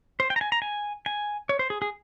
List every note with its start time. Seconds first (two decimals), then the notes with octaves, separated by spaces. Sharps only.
0.20 C5
0.30 G5
0.36 A#5
0.41 G#5
0.52 A#5
0.62 G#5
1.06 G#5
1.49 C#5
1.59 C5
1.70 G#4
1.82 G#4